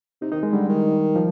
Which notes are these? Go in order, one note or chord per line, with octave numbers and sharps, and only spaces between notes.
C3 D#4
D#3 D#4
G#3
D3 G3
D#3
F3